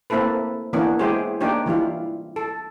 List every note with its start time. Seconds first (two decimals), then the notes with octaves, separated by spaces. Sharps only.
0.10 A3 A#3 C4 E4 A4 B4
0.73 E3 A#3 B3 C#4 D4
0.99 G#3 E4 G4 G#4 C5 C#5
1.41 A#3 D4 D#4 G4 C#5
1.66 E3 G3 E4 F4
2.36 A4